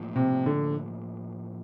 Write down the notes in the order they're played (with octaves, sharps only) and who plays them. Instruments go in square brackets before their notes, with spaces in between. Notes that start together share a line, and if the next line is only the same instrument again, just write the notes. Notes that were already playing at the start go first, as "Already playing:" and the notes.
Already playing: [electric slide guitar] A2 F3 A#3
[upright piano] C3
D3